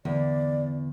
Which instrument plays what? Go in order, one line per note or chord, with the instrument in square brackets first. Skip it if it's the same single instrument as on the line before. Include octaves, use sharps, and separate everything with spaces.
[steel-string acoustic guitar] E2 [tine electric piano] D3 [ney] D5